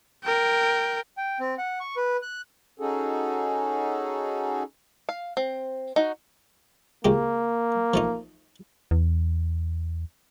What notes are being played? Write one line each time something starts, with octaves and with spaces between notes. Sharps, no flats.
A#4 G5
G5
C4
F#5
C#6
B4
F#6
C#4 D#4 F#4 G#4 A4
F5
C4
D#4 F#4
C#2 G#3 A#3 G4
F3 A3 D#4
E2